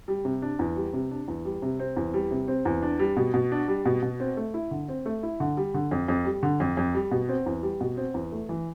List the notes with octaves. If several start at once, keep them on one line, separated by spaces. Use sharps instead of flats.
G3
C3
D4
E2
G3
C3
D4
E2
G3
C3
C4
E2
G3
C3
C4
E2
D4
G3
B2
B2
D4
G3
B2
B2
C4
A3
E4
D3
C4
A3
E4
D3
G3
D3
F2
F2
G3
D3
F2
F2
G3
B2
C4
E2
G3
B2
C4
E2
A3
E3